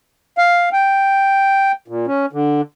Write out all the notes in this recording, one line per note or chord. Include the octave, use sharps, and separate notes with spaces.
F5
G5
A#2
C#4
D3